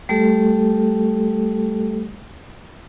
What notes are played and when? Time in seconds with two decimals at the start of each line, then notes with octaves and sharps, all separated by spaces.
0.09 G3 A3 G4 A4